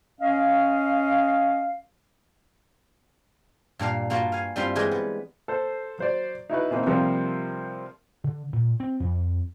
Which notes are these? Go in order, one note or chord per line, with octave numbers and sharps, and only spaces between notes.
C#4 D#5 F5
G2 A#2 D4 F5
G2 A#3 F4 F#4 B4 A5
F5 G#5
G2 G3 C4 E4 F4 C6
E3 G3 G#3 G#4 A#4 D5
B3
A4 C5
F#3 C5 D5
D#4 E4 F#4 B4
B2 E3 A#3 C4 D#4
C3 F3 G3 A#3 C4
D3
A#2
C4
F2